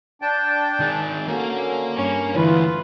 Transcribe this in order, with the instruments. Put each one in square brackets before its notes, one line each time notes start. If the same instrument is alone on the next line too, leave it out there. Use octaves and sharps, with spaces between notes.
[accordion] D4 G5 A5
[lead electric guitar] D#3 G#4
[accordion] D3 F#3 C#4 [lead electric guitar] A#3 A#4
[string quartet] G2 C#4
[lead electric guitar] D2 [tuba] E3 [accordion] F4 [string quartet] B4